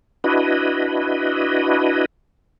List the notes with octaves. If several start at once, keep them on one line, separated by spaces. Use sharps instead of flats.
D4 E4 F#4 B4 D#5